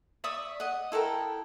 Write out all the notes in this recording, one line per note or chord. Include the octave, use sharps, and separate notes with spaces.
D5 E5 C#6 D#6
D#5 F#5
E4 A4 A#4 G5